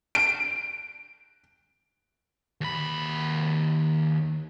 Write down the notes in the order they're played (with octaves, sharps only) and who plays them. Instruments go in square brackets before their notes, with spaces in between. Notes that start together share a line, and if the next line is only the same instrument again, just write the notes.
[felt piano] D7
[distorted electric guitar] D#2 B5